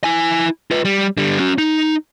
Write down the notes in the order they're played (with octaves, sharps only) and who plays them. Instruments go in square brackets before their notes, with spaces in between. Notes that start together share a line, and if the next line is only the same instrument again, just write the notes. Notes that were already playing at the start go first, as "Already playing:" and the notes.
[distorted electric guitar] E4 G#5
F4 B4
G3
D3 G3
C#4 F#4
D#4